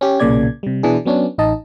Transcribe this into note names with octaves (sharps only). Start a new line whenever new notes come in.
C#4 G4
B1 A#2 C#3 A#3 D5 G#6
C3 G3
B2 E3 D4 G#4
F#3 B3 C#4 D4
A1 D#4 D#5 A5